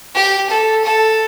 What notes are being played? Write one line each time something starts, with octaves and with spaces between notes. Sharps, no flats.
G4
A4
A4